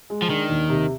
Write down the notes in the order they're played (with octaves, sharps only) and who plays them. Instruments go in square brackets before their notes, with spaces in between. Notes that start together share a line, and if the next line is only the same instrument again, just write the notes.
[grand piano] G#3
[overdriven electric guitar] F3
[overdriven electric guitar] D#3 [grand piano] D4
[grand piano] D#2
C3